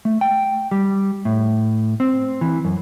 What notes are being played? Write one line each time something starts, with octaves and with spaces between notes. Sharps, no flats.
A3
G5
G3
A2
C4
E3
F#2